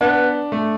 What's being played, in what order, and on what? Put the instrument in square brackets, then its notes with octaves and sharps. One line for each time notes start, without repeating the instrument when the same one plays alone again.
[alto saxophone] B3 [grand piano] D4
[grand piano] A3